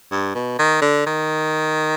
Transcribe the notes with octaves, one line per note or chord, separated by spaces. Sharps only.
G2
B2
D#3
D3
D#3